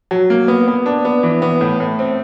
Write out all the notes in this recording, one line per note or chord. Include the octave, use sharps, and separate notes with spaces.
F#3
A#3
B3
B3
D4
B3
E3
B3
A2
A2
C4